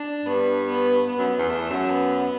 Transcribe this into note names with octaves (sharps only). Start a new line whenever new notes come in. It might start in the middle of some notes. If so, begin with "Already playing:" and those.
Already playing: D4
G2 B3
B3
B3
F#2
E2
E2 A3
F#2
B3